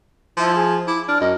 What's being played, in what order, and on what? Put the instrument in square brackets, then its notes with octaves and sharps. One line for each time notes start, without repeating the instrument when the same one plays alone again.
[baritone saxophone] F3 [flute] E4
[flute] G#4
[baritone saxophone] E4 [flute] D6
[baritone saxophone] D4 [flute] F6
[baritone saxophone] F#2 [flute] D#5